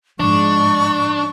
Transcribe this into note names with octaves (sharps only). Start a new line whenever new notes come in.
G#2 F3 G#3 D4 C#6